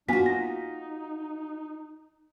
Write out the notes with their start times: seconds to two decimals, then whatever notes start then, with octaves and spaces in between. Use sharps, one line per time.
0.09 A#3 B3 D4 F4 F#4 G#5 B6
0.26 D#4 A#6